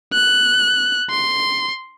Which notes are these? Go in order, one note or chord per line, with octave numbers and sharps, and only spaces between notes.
F#6
C6